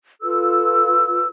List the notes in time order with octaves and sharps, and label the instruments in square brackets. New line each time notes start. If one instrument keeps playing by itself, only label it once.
[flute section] F4 A4 B4 E6